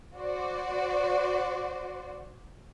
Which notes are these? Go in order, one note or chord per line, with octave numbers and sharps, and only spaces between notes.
F#4 C5 D5